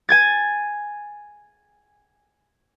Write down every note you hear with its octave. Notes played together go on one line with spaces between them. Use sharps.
G#5 G#6 A6